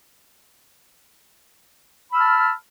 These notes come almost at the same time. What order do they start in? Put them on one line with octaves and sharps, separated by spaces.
B5 E6 F6 A5